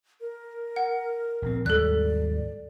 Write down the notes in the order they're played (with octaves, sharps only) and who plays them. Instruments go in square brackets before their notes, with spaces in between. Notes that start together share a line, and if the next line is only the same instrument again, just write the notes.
[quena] A#4
[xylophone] F#5
[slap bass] A#1 C4
[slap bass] D#2 G#2 G3 [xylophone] A4 F#6 [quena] D5